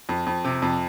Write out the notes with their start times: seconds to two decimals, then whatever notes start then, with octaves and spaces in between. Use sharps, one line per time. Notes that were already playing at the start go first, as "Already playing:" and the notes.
0.09 F2
0.27 F2
0.45 C3
0.62 F2